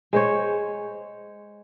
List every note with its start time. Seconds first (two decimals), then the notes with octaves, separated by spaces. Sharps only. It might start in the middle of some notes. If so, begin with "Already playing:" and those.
0.13 G#3 C5 C#5